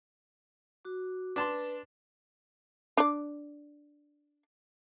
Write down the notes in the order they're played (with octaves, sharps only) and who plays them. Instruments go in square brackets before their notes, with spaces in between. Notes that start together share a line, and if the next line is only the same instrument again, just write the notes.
[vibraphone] F#4 D6
[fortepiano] D4 A5 C6 [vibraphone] B4
[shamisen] D4 D5